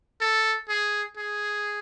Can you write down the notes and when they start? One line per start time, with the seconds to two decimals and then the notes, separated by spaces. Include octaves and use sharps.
0.21 A4
0.69 G#4
1.17 G#4